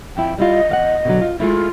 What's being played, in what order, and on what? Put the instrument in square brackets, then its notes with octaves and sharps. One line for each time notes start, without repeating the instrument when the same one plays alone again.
[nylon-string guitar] F2 E4 [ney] G5
[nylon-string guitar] G3 E4 F4 [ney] D#5
[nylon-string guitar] E2 F5 F#5
B2 D3 F#3
F4
[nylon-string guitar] G#3 A3 E4 [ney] F4